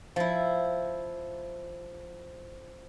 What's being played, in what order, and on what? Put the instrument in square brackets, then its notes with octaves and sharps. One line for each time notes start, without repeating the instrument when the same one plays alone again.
[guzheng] F3 E4